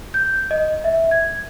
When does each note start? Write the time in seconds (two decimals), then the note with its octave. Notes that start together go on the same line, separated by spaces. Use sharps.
0.14 G6
0.51 D#5
0.84 E5
1.11 G#6